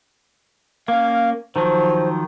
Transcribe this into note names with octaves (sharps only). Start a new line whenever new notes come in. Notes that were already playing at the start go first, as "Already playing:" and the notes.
A#3 C#4 F5
D#3 F3 F#3 C5